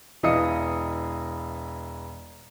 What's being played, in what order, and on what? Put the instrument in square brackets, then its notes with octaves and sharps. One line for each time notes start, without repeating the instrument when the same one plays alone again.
[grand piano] E1 E3 D#5 F5 D#6 C#7